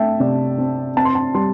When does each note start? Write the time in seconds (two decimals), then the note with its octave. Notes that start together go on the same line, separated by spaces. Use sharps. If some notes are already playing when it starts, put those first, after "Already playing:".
Already playing: A3 C4 E5 G5 A5
0.20 C3 D5
0.58 C4
0.97 C4 A5
1.05 C6
1.15 A5
1.35 G3 C6